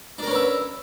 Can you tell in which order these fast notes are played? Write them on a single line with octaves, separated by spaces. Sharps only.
D4 A#4 C#4 B4 E5